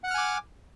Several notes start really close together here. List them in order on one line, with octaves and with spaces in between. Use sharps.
F#5 F#6 F6 G#5 D6